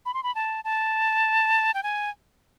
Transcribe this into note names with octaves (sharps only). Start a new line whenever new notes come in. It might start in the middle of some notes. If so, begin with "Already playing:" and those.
B5
C6
B5
A5
A5
G5
G#5